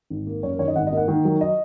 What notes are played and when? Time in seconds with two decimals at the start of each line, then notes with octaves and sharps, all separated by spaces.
0.10 G#1
0.27 A#3
0.43 F#2 C#5
0.51 A#4
0.59 D#3 C#5
0.68 D#5
0.76 G#1 F#5
0.87 D#5
0.93 A#3 F#5
1.08 D#3
1.25 F#3
1.41 D#5